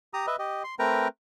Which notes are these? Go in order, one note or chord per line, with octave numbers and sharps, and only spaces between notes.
G4 A#5 D#6
B4 D#5 E5
G4 D#5
C6
A3 C4 A#4 B4 G5 A#5